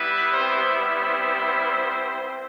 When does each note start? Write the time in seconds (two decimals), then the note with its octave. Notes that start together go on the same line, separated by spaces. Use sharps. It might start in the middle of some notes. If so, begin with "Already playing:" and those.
Already playing: G3 B3 E4 B4
0.33 C4 C5
1.01 C4 C5